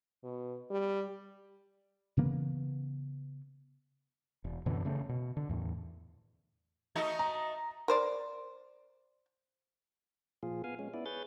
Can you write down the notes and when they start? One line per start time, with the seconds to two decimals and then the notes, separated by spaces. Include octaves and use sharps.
0.24 B2
0.71 G3
2.17 C#3 E3 A#3 B3
4.44 E1
4.66 F#2 B2 D3 E3
4.85 C#3 A3 C#4
5.09 B2
5.37 D3
5.49 E2 A2
6.95 A3 D#4 F#4
7.19 A#5
7.88 A#4 C5 D5
10.43 A#2 F3 F4 G#4
10.64 B3 F5 G#5
10.79 G#3 C#4
10.94 B3 E4 D5
11.06 G#4 B4 C#5 G6 A6